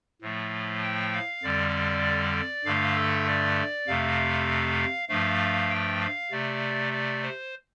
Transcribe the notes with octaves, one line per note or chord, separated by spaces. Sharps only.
A2 F3 A3
G5
F5
F2 D3 G3 D5
G2 D3 A3 F5
A4
D5
F2 C3 A3 F5
G2 F3 A3 F5
G5
F5
C3 A3 D5
D5
C5